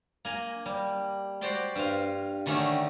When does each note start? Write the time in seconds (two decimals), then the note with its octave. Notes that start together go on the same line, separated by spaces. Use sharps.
0.25 A#3 G#5 A#5
0.66 G3
1.41 F#4 G4 C5 D5 G5 C6
1.76 G2 C5 F5
2.46 D3 D#3 A3 C#4 G4